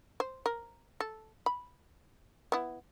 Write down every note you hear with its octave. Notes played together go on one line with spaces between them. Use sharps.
C5
A#4
A4
B5
B3 E4